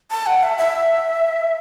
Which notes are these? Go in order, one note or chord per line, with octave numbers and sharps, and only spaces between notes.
A5
F#5
E5
E5